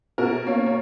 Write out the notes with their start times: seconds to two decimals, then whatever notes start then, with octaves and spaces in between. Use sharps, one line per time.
0.18 B2 A#4
0.47 A#3 C#5
0.66 C#5